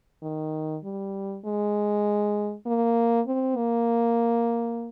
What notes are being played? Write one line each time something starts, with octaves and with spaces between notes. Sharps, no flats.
D#3
G3
G#3
A#3
C4
A#3